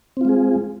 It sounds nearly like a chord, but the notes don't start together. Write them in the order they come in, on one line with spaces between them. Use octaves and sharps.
C4 F4 G#3 G#4